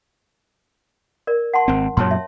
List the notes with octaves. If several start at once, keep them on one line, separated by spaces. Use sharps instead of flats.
A#4 D5
F#5 A5 C6
G#1 C4
F#2 A#2 F#3 C#5 A5 C6
E5